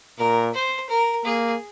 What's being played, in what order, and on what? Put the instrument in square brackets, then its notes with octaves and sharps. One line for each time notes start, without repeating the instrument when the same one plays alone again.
[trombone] A#2 [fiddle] A#4
[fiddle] C5
A#4
[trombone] A#3 [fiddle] G#4